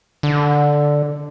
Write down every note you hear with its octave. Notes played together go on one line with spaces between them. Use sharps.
D3